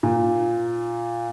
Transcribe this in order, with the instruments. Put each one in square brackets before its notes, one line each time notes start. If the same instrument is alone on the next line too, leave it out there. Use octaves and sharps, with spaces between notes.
[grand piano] A#2